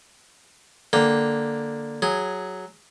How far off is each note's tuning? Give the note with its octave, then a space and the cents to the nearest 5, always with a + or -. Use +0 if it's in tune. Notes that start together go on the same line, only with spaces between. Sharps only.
D3 +0 A#3 +0 G5 +0
F#3 +0 G#4 +0